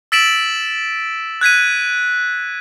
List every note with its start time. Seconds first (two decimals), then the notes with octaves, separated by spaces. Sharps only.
0.12 E6 A6 B6 D7 E7 F#7
1.41 F#6 G#6 B6 D#7